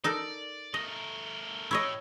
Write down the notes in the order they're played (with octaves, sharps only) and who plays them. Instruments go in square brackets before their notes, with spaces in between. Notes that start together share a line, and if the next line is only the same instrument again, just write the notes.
[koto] D#4 A4 A#4 [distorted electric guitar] D5
[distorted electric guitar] A3 A#4 [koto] D#5
[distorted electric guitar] A2 [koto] E4 C#5 D#5